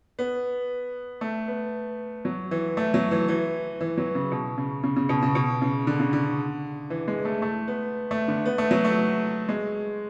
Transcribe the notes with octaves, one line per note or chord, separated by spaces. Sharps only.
B3
A3
B3
F#3
E3
A3
F#3
E3
E3
E3
F#3
C#3
B2
C#3
C#3
C#3
B2
C#3
B2
C#3
D3
C#3
D3
E3
G#3
A3
A3
B3
A3
D3
B3
A3
F#3
A3
G#3